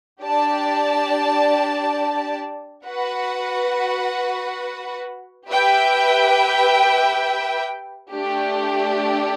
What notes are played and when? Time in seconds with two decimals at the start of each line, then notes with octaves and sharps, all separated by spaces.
0.24 D4 G4 D5 A5
2.87 F#4 B4 F#5
5.48 G4 B4 E5 G5
8.11 A3 D4 G4